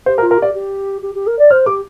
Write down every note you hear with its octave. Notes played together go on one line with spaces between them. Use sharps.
G4 C5
A#4
F4
A#4
G4 D5
G4
G4
G4
A#4
D5
C5 F6
G4 D6